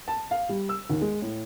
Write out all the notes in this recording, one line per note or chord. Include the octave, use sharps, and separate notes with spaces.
A5
F5
G3
E6
D#2
G#3
A2